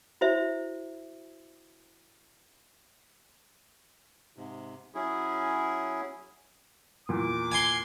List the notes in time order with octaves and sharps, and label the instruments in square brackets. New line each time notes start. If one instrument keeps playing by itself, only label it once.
[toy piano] E4 F#4 C5 E5
[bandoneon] G#2 C3
F#3 C#4 E4 G#4
[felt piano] E2 A#2 [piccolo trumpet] D6
[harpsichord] G#5 C6